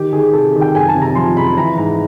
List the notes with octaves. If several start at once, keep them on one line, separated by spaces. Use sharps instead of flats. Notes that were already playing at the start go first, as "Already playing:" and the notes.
Already playing: D#3 G4
D#3 G#4
C3 A4
D#3
G5
F#1 G#5
A5
C3
A#5
F3 C6
F#1 B5
E3 A#5
G#2 A#5